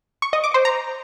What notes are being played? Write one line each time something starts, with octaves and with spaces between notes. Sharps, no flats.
C#6
D#5
D6
C5
A#5